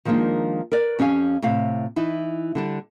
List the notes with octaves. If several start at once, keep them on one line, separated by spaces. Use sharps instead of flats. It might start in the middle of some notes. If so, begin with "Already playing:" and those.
D#3 F3 G#3 A#3 D4 D#4
A#4 B4 D5
F2 C#4 G4 F5 G#5
A2 C3 F5
E3 D#4 E4
D3 G3 D4